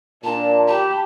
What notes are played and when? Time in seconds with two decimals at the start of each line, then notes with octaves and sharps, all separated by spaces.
0.24 A#2 D4 A5
0.67 G4 A5 B5